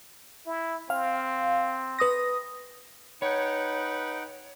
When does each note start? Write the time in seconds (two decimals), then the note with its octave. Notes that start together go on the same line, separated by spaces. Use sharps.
0.46 E4
0.90 C4 F5
1.99 B4 D#6 A#6
3.22 D#4 B4 C#5 F#5 G5